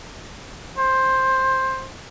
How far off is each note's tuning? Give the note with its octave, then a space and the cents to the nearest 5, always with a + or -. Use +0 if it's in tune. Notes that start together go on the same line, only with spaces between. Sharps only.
C5 +10